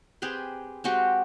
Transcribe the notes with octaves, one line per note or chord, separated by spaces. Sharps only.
C4 G4 G#4 B4
G#3 C4 F#4 G4